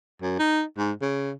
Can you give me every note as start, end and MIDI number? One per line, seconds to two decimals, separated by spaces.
0.22 0.36 42
0.39 0.62 63
0.78 0.92 44
1.02 1.32 49